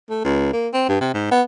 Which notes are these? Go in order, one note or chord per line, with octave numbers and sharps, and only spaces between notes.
A3
C#2
A#3
C4
G2
C3
G#2
B3